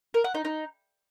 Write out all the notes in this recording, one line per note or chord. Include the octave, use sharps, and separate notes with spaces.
A#4
F#5
D#4
D#4